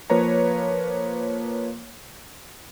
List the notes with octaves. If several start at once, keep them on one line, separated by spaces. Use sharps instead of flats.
F3 A#3 B4 C#5 A#5